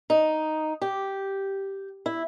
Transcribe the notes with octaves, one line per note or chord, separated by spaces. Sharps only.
D#4
G4
E4